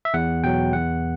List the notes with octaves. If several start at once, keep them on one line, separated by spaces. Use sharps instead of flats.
E5
E2 F#5
B2 F#3 G5
E2 F#5